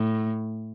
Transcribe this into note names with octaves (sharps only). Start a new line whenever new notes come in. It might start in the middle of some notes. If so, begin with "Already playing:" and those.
Already playing: A2